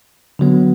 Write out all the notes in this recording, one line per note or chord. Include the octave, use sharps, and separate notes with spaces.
D3 F#3 B3